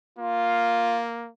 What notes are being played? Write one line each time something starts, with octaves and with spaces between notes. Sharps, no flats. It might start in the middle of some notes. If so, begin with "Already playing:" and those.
A#3 F4